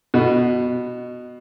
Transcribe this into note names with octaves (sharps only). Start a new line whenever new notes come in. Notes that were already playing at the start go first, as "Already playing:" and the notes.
B2